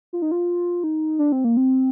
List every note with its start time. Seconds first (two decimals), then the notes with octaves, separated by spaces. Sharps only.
0.13 F4
0.22 D#4
0.31 F4
0.84 D#4
1.19 D4
1.32 C4
1.44 A#3
1.57 C4